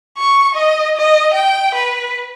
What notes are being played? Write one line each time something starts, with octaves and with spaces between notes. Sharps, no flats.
C#6
D#5
D#5
G5
B4